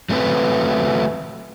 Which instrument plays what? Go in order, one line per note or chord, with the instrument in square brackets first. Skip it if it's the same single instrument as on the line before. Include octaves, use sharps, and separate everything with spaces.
[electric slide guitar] F#3 A3 C4 B4